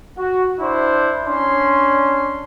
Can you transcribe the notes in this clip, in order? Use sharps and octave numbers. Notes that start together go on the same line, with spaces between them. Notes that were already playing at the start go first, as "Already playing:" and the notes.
F#4
D4 E4 C5
C#4 D4 C6